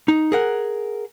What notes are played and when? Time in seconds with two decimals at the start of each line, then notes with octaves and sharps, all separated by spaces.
0.08 D#4
0.32 G#4 A#4 F#5